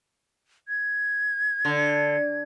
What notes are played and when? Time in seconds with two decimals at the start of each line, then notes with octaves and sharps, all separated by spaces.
0.68 G#6
1.65 D3